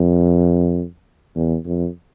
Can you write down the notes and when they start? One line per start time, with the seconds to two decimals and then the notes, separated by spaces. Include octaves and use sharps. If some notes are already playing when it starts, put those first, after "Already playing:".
Already playing: F2
1.35 E2
1.66 F2